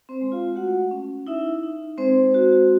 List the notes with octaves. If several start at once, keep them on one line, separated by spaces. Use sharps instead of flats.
C4 C5
G#3
F4 F5
A3 F#4 F#5
C#4
D#4 E4 E5
D#4
G#3 C4 C5
F#4